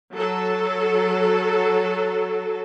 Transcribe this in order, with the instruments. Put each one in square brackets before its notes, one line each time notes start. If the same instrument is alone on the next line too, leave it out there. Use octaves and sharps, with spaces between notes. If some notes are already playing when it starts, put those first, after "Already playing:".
[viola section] F#3 A4